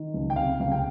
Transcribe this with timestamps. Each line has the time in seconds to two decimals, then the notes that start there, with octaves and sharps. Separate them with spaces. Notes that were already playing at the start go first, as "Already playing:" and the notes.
Already playing: D#3
0.14 C#2
0.30 G5
0.36 C3 F5
0.60 C#2 F5
0.72 G5